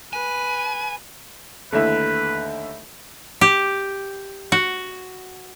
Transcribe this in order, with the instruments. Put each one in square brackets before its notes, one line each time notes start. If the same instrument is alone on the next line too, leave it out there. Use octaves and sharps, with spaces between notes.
[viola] B4 [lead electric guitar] G#5
[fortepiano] D#2 D3 [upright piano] A3 E4 E5 [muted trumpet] B4
[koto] G4
F#4